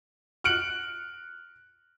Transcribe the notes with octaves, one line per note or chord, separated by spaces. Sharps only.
F6 F#6 C#7 D7 F#7